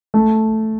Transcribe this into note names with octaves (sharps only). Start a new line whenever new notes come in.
A3